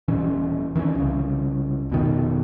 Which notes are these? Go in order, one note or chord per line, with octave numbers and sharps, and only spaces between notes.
D#1 E3 C#4
D#3 E3 C4 C#4
C2 C#3
F1 B2 D#3